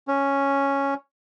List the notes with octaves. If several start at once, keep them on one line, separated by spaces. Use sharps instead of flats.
C#4